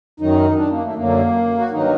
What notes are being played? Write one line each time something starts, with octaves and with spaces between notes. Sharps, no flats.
F#2 D#3 F#3 D#4
D4
A#3
A3
F#2 D3 F#3 A#3
F#4
G2 D#3 F#3 D#4